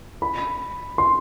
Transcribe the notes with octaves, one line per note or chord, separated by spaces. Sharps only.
B5
C6